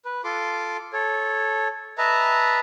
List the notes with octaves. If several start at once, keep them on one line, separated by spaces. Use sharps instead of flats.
B4
F4 A4 C6 D6
A4 C#5
B4 D#5 E5 A5 A#5